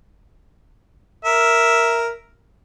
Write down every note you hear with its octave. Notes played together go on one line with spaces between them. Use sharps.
A#4 E5